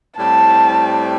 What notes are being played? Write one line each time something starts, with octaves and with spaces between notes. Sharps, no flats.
A2 G3 C4 A5